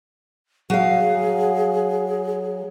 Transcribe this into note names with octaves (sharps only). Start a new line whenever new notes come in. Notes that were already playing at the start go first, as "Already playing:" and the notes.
F#3 G#4 F5